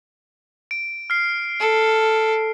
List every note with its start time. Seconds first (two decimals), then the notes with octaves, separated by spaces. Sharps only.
0.71 D7
1.10 F6 C7
1.60 A4